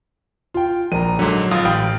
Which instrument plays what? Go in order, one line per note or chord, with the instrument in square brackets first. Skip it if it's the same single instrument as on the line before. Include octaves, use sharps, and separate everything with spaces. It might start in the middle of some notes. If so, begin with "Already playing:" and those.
[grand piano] F4 G5
[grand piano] A#1 A#3 A#5 [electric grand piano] D#7
[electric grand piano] G#2 D3 [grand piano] F#3
[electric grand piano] G#1 F4 D#6
[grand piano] A1 [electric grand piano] F5 G5 B5